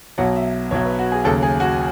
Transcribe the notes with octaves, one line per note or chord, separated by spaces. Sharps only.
B1 B2 F#3 F#5
E5
B1 B2 F#3 C#5
B4
F#4
G#4
D#2 C#3 F#3 A4
G#4
F#4